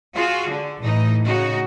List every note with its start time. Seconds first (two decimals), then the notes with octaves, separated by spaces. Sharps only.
0.15 F4 F#4 G#4
0.49 D3
0.81 A2 E3 D#4
1.23 C#3 D#4 F#4